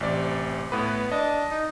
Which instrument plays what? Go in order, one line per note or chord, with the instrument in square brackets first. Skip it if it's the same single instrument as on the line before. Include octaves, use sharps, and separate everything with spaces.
[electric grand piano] A1 D5 [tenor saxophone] C3
[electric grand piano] A2 B4 [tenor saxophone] B3
[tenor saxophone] D4 [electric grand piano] D#5
[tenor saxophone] D#4